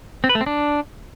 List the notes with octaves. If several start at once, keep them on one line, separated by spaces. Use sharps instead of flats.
C4
B4
A3
C4
D4